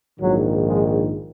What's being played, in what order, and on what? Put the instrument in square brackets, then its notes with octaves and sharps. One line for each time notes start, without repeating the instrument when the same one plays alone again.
[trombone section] A#1 G#2 D#3 F#3
F3 G#3